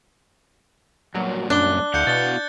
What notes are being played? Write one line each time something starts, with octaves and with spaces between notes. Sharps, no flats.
G2 A#2 F#3 A#3
F#2 D4 F#6 G7
D2 E4 F5 F#5 F#6 G6 C#7
B2 A6 G7